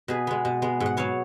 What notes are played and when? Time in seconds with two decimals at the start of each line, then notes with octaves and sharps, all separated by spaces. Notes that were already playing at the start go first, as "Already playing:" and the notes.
0.08 B2 G#4 B4
0.27 G#3 B3
0.45 B2
0.62 G#3 B3
0.80 G#2
0.86 F#5
0.97 F#3 B3 C#5 F5